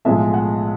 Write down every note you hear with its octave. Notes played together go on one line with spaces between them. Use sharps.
B1 A2 F3 G#3 E5
F#5